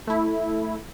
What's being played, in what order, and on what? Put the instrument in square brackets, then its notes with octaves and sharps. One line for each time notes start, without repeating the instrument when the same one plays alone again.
[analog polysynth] A3 E4